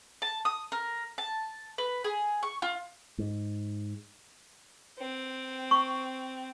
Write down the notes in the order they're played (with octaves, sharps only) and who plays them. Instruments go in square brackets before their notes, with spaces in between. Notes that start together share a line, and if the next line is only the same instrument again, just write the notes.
[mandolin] A5
D#6
A#4
A5
B4
G#4
C#6
F4
[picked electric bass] G#2
[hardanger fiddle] C4
[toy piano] C#6